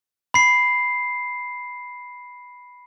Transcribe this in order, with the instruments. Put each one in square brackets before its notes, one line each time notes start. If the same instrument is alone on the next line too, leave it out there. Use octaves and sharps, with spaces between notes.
[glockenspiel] B5 C7